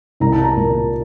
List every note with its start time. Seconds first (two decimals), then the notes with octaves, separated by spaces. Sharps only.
0.20 C2 A#5
0.32 A5
0.44 A#5
0.56 A#2